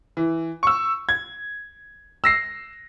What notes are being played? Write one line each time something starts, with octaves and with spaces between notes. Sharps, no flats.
E3
C#6 E6
G#6
E6 A#6 C7